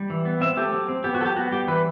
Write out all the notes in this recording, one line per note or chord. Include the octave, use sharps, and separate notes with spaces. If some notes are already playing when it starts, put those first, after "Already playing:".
Already playing: G3
E3
B3
C4 E5
A3 G4
F#3
C4
B3 G4
F#4
F#3 G4 A4
B3 F#4
G3 G4
E3 B4